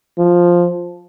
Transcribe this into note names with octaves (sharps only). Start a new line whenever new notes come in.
F3